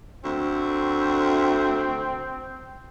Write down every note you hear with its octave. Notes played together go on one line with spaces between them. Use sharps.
D2 C4